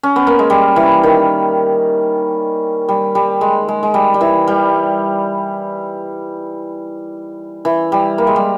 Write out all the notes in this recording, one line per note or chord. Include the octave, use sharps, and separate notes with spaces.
C#4
B3
A#3
G#3
G3
E3
D#3
G3
G3
G#3
G#3
G#3
G3
G3
E3
G3
E3
G3
A#3
G#3
G3